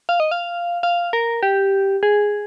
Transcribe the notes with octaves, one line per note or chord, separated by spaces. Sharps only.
F5
D#5
F5
F5
A#4
G4
G#4